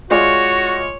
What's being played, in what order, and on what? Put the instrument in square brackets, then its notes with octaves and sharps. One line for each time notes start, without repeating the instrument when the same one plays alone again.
[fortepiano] G#3 F4 D5 [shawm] F#4 [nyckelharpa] C#5